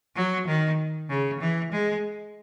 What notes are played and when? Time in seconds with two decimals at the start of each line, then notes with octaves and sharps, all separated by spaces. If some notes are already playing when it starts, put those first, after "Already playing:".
0.16 F#3
0.47 D#3
1.09 C#3
1.40 E3
1.72 G#3